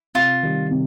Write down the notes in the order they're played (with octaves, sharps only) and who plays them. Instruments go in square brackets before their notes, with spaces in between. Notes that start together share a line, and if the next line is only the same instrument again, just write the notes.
[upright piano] C3 [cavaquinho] F4
[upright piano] D#3 G3
C3